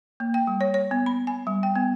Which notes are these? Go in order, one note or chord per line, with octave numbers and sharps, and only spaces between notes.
A#3
G5
G3
C#5
C#5
B3
B5
G#5
G3
G5
B3